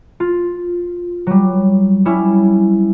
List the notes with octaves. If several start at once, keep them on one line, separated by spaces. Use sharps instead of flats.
F4
F#3 G3
G3 C#4 E4